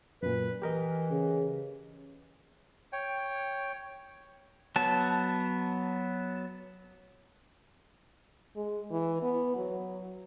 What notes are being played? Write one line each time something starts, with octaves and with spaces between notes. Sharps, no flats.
F#2 A#2 B4
E3 G4 A#4 D#5
C#3
C#5 G5
F#3 B3 A5
G#3
E3
B3
F#3